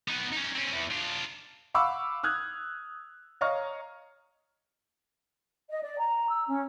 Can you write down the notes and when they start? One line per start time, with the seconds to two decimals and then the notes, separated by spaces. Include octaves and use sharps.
0.08 B3 D#4
0.33 C#4 D#4
0.55 C4 C#4
0.73 E2
0.91 D4 F4
1.74 F5 F#5 B5 C#6 D6 E6
2.23 D#6 F6 F#6 G#6
3.41 C#5 D#5 F5 A#5 C#6 F6
5.70 D#5
5.83 D5
5.99 A#5
6.30 E6
6.47 C#4